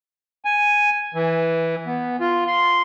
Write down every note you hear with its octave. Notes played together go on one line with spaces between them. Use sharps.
G#5
E3
B3
F4
C6